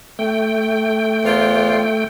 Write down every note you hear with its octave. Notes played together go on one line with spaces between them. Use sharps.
A3 G5
E2 F4 C5